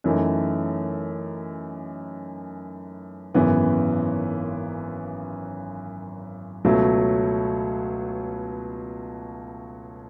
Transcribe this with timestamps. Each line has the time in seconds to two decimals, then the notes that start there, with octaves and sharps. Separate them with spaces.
0.04 F#2 E3 A3 D#4
3.34 G#1 F#2 C#3 E3 B3
6.65 C#2 B2 F#3 A3